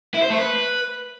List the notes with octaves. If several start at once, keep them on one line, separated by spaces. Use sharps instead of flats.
E4
C5
A3
B4